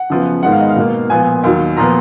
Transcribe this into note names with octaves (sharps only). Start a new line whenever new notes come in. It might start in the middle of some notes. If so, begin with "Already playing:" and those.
Already playing: F#5
F#2 C#3 F3 B3
G#2 D#3 G#3 B3 F#5
F5
D#5
F5
B2 A#3
A#2 F3 B3 G#5
D#2 D#3 F#3
A#2 F3 B3 A#5